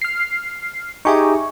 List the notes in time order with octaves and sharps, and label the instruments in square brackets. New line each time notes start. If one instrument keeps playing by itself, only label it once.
[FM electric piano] F6 C7
[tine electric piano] D#4 G4 G#4 [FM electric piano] E5 G#5 C#6